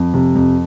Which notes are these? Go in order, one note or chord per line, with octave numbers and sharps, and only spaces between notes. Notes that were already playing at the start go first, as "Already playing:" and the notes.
Already playing: F2
C3
F2